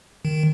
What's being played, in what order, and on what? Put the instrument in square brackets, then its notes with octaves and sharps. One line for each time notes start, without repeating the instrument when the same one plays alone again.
[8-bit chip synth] D#3